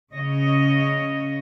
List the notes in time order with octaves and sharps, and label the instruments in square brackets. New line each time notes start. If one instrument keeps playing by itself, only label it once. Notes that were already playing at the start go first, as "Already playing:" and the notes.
[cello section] C#3 C#5 D#5